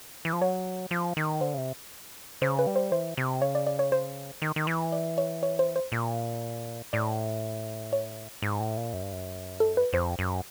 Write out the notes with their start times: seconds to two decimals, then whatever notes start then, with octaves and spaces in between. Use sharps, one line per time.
0.25 E3
0.33 F3
0.41 F#3 C#5
0.91 F3
1.17 D#3
1.41 D3 C5
1.54 C#3
1.58 C3
2.42 C#3 C5
2.59 B4
2.67 G3
2.76 C5
2.92 E3 C5
3.17 C3
3.41 C#3 C#5
3.55 D5
3.67 D5
3.79 C#5
3.92 C5
4.42 D#3
4.56 D#3
4.67 E3
4.92 D5
5.18 C#5
5.43 C#5
5.59 C5
5.76 C5
5.92 A#2
6.93 A2 D5
7.93 C#5
8.42 G#2
8.60 A2
8.77 A#2
8.93 F#2
9.02 G2
9.12 F#2
9.60 A4
9.77 B4
9.93 F2 C5
10.19 F#2